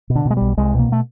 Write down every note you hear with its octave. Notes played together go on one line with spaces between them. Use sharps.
B2
D3
B2 G#3
B1 G3
C2 G#3
B2
A#3
A3